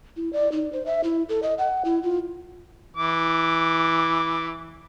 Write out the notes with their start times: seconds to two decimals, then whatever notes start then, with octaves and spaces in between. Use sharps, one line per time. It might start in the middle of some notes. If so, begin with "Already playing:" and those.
0.17 E4
0.33 D5
0.52 D#4
0.73 C5
0.86 E5
1.04 E4
1.29 A4
1.43 D#5
1.58 F#5
1.85 E4
2.03 F4
2.97 E3 D6